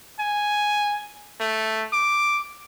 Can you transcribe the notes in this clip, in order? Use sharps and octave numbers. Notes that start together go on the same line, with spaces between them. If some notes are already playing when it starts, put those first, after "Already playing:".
G#5
A3
D6